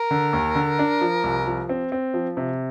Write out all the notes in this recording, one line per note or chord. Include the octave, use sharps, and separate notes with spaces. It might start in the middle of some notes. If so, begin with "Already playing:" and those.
Already playing: A#4
D3
D#2
D3
D4
F3
C2
F3
C4
C4
F3
C3